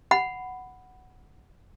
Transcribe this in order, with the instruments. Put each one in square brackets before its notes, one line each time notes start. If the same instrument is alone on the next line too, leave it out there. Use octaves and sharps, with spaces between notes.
[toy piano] F#5 B5